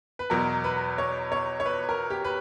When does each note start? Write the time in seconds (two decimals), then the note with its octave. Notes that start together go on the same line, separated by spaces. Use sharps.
0.19 B4
0.30 E2 B2 F#3 A#4
0.64 B4
0.98 C#5
1.32 C#5
1.60 C#5
1.66 B4
1.89 A#4
2.10 G4
2.24 B4